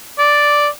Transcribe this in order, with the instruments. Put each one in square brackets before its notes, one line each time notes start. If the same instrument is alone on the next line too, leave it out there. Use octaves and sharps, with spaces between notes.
[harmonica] D5